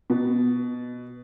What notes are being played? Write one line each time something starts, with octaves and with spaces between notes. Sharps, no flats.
B2